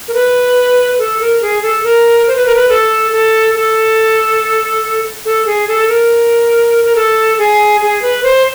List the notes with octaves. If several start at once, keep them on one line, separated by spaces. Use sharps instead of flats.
A#4
B4
A4
A#4
G#4
A4
A#4
C5
B4
A#4
B4
A4
A4
A4
A4
G#4
A4
A#4
A#4
A4
G#4
G#4
B4
C5